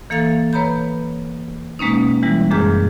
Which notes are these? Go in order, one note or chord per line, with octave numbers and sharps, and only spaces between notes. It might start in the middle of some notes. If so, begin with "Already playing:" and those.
E3 A#3 A4 F5 A6
B4 C#5 A#5 B5 G6
B2 G#3 A#3 C#4 D#4
E3 G3 G#3 E4
F#2 A#2 G#3 G#4 F6 G6